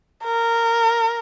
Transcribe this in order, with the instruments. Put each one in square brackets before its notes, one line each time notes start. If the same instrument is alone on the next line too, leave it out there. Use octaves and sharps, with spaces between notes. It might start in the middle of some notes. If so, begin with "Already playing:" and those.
[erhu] A#4